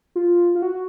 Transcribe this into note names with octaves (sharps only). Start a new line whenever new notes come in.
F4
F4
F#4